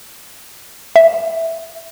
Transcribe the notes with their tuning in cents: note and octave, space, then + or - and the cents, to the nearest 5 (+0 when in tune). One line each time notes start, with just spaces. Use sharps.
E5 -5